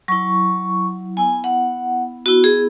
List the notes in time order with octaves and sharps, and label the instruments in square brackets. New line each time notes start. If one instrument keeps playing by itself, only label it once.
[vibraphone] F#3 E4 C#6
B3 E4 G#5
F#5
B3 E4 F#4
G#4